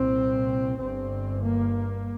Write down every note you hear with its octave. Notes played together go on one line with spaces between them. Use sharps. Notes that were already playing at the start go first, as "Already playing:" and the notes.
Already playing: C2 A#2 C4
G1 G2 C4
A#3